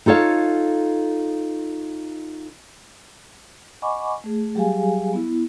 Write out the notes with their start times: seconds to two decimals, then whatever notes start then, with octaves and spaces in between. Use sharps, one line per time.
0.06 D#4 F4 A4 C#5 F5
3.82 D#5 F#5 G#5 B5 C#6 D6
4.24 A3 G#4
4.55 F#3 G3 G4 G#4 F5 G#5
5.13 B3 E4